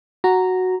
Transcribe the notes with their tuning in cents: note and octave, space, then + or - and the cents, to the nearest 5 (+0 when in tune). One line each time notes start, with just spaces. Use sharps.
F#4 +0 A#5 -5